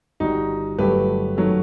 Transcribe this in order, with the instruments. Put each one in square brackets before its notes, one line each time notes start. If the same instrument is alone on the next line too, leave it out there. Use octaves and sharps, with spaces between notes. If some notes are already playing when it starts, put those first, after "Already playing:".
[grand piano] G1 G2 D#3 G3 D#4 F#4
G1 G2 F#3 A3 G4 B4
F#2 D#3 F#3 A3